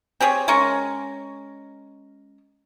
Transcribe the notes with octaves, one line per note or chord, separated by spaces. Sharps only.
C4 G4 G#4 C#5
G#3 C#4 A#4 C#6